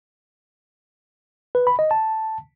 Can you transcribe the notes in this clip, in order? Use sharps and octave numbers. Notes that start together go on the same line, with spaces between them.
B4
B5
D#5
A5